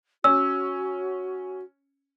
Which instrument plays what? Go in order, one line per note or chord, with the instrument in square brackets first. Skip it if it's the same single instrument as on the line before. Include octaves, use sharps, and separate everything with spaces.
[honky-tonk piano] C#4 [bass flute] F#4 [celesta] E6